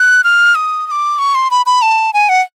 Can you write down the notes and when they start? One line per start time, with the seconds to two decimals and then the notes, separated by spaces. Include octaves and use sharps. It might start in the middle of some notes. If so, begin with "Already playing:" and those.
Already playing: F#6
0.24 F6
0.55 D#6
0.87 D#6
0.91 D6
1.19 C#6
1.35 C6
1.51 B5
1.66 B5
1.82 A5
2.14 G#5
2.29 F#5